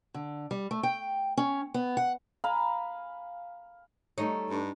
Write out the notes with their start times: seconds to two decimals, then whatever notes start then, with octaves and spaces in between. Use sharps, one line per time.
0.14 D3
0.51 G3
0.71 A3
0.83 G5
1.37 C#4
1.74 B3
1.97 F#5
2.44 F5 G#5 A#5 B5
4.18 G3 A3 D#4 C#5
4.50 G2 D4